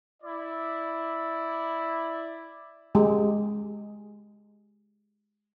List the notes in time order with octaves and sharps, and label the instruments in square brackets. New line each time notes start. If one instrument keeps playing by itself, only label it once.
[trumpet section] E4 D5
[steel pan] G#3 G4